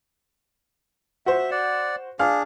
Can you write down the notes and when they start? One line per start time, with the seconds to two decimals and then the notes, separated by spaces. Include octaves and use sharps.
1.26 F#4 C5 E5
1.51 D5 F#5
2.19 D4 G#4 F5 F6